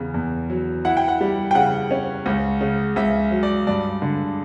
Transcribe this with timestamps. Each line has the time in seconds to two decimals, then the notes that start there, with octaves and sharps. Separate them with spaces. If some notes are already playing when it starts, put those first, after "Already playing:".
Already playing: E2 C#3
0.14 E2
0.50 F#3
0.85 E4 F#5
0.97 G5
1.08 F#5
1.21 G3
1.51 G5
1.55 C#3 F#5
1.91 C#4
2.26 C#2
2.61 C#3
2.96 C#2 E5
3.31 F#3
3.43 D5
3.67 G2 D5
4.02 D3